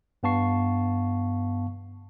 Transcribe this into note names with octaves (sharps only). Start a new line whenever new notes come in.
G2 B3 F5 A5 C#6 C7